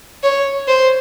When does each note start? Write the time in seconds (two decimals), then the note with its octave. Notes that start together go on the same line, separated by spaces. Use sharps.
0.23 C#5
0.68 C5